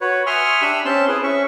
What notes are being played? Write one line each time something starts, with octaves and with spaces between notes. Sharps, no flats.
F#4 B4 C#5
E5 G#5 C6 C#6 D#6 F6
D4 G4 E5 B5 E6
C4 C#4 A5 C6
E4 G#4 B4
C#4 E5 C#6